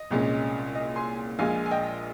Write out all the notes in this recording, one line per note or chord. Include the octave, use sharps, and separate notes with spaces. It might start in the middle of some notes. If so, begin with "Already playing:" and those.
Already playing: D#5
C2 A#2 G#3 C#4
D#5
G#5 C6
A#1 A#2 G#3 F5 G#5
G#5
D#5 G5